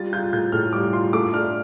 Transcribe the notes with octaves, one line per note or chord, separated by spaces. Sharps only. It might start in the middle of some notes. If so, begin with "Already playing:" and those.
Already playing: G3 F4 A6
F4 G6
A2 G6
A2 F6
G3 D6
F4 C6
A3 D6
D4 F6